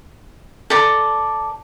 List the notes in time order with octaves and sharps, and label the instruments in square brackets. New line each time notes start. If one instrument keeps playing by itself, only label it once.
[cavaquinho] A4 D5 A#5